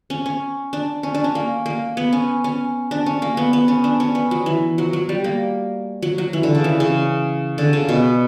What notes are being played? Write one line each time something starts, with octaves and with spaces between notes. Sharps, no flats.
C#4
C#4
D4
C#4
D4
C#4
A#3
A#3
B3
C#4
C#4
D4
C#4
A#3
B3
B3
C#4
D4
C#4
B3
F#3
E3
F#3
F#3
G3
A#3
F#3
F#3
E3
D3
C#3
E3
C#3
D3
C#3
B2